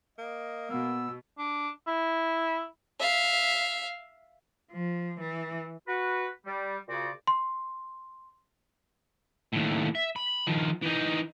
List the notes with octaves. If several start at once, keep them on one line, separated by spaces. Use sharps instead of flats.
A#3 D#5
B2 B3 E6
D4
E4
E5 F5
F3
E3
F#4 B4
G3
A#2 C#3 F#4 C5 D5
C6
D#2 A2
E5
B5
D#3 F3
E3 D#4